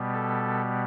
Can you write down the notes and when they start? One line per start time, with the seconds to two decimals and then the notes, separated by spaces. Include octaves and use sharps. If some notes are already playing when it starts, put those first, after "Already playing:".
Already playing: B2 G3 B3
0.13 A4